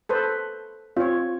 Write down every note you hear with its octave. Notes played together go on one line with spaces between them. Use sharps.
A4 B4 C5
C4 F4 C#5